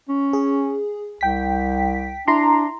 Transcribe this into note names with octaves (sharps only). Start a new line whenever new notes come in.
C#4
G#4
C2 G5 B6
D4 E4 A#5 C6